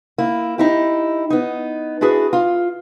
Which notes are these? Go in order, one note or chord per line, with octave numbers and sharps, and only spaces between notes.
A#3 E4
D#4 E4 G4
B3 D#4
D4 E4 F#4 G#4 B4
F4